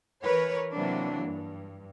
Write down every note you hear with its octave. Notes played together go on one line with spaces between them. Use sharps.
E3 A#4 B4 C#5
C3 E3 F#3 A#3 D4
G2